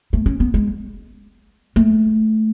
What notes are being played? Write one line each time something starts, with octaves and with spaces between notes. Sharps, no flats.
A3
C#4
B3
G#3
A3